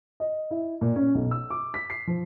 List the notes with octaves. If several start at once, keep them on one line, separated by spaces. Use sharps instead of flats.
D#5
E4
A#2
C#4
B1
E6
D6
B6
C7
F3